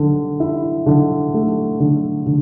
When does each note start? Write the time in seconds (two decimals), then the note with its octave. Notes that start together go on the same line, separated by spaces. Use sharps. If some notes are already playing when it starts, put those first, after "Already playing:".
Already playing: D3
0.40 E4
0.86 D3
1.34 A3
1.80 D3
2.27 D3